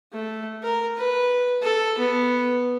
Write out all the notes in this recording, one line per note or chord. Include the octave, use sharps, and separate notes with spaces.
A3
A#4
B4
A4
B3